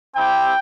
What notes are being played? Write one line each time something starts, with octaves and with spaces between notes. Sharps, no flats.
C4 E4 G4 G5